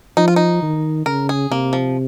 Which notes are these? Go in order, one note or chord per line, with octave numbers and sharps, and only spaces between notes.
F3 D#4
F4
D#4
D#3
C#3 A#4
G#4
C3 A#3
F3